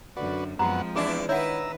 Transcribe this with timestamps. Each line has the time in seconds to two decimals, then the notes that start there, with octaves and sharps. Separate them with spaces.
0.17 F#2 D3 F#4 B4 D5
0.59 F#2 F3 G#3 B3 C4 F#4 F#5 A#5
0.96 E2 B3 D4 E4 G#4
1.29 D#3 E4 B4 C#5 F#5 A#5 E6